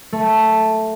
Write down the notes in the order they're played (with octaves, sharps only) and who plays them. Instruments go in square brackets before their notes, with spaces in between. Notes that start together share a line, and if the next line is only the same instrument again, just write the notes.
[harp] A3